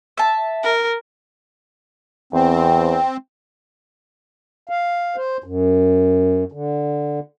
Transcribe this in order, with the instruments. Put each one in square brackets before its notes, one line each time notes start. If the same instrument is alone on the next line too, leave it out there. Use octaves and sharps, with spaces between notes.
[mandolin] E5 A5
[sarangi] A#4
[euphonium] E2 [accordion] C4
[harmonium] F5
C5
F#2
D3